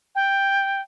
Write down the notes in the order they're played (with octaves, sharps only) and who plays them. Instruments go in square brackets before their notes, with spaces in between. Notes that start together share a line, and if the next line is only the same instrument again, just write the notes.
[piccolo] G5